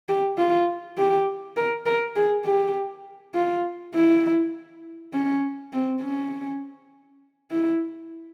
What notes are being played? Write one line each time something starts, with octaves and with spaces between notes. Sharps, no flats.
G4
F4
G4
A#4
A#4
G#4
G4
F4
E4
C#4
C4
C#4
E4